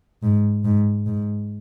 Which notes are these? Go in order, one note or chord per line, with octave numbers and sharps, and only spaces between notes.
G#2
G#2
G#2